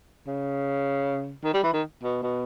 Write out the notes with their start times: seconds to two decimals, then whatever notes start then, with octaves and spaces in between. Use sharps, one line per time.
0.27 C#3
1.44 D#3
1.54 G3
1.63 E3
1.73 D#3
2.03 B2
2.22 B2